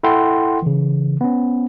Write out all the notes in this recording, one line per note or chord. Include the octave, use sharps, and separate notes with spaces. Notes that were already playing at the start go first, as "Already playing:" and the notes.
E4 A4 F#5 G5 C6
C#3 E3
B3 C#4